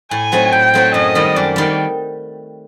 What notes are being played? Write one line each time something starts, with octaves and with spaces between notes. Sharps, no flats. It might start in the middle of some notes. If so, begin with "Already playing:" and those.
A2 G#5
F#3 A3 C4 D#4
A2 G5
F#3 A3 C4 D#4
F#2 D#5
D#3 G3
F#2 D5
D#3 G3